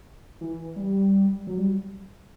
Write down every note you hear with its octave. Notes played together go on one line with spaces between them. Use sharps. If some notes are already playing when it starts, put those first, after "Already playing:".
E3
G3
F#3
G3